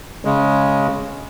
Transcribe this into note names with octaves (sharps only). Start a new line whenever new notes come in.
C#3 G#3